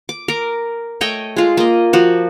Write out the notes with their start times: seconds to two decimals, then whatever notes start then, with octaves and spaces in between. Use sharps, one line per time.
0.09 D6
0.28 A#4 D6
1.01 A3 C#5 D#5 G5
1.37 G#3 F4
1.57 A#3 D#5
1.93 F3 F#4